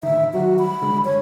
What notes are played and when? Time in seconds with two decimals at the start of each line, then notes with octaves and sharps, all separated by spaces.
0.03 A2 D3 D#3 E5
0.34 D#3 F#3 G3 F#4
0.59 B5
0.81 F#1 D3 G#3
1.05 G2 C#5